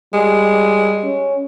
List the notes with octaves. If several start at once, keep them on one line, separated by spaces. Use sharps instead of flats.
G3 G#3
C#4